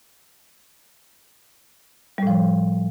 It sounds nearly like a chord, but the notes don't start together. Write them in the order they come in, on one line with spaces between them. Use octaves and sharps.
G3 A2 F3